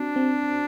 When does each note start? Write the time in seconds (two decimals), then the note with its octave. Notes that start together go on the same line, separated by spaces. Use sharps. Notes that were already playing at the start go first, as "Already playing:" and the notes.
Already playing: C4 D4 F#4
0.16 C4